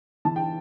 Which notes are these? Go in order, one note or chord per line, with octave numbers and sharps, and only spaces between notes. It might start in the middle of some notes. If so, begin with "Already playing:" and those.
E3 A5
G5